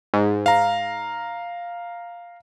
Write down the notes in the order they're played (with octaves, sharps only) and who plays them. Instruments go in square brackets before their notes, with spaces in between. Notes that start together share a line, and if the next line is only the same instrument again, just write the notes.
[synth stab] G#2
[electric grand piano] F5 A#5